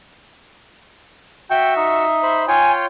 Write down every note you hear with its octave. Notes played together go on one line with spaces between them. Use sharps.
F#4 E5 G5 C#6 E6
D#4
C5 B5
F4 C#5 G5 G#5